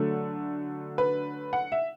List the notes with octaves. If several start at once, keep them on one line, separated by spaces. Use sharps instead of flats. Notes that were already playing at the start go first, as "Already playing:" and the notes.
Already playing: D3 F#3 A3 A4
B4
F#5
E5